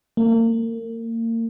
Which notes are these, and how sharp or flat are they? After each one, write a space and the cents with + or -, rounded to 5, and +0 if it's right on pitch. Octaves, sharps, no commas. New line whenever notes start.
A#3 -35